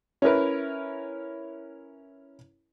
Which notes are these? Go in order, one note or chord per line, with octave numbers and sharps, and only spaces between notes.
C#4 E4 A#4 B4